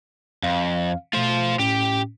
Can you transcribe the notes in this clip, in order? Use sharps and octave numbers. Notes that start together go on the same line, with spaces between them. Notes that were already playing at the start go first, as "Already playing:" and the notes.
F2 F5
B2 A3 F4 C5
A2 C#4 G4